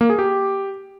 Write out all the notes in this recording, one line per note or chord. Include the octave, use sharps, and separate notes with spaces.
A#3
G#4
G4